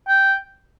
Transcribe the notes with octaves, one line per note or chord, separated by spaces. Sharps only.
G5